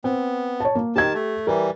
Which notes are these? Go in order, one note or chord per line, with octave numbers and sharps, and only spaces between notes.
B3 C4
C#5 A5
A#3
D#3 G4 A5 G#6
A3
E3 G3 A#4